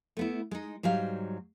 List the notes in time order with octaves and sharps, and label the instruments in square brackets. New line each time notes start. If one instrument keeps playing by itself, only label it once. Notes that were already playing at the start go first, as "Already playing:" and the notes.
[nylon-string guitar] A3 B3 E4
G#3 D#4
G#2 F#3 G3 F5